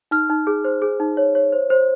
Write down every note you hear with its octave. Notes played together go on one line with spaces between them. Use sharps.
D#4 F6
D#4
G#4
C5
G#4
D#4
C#5
C#5
C5
C5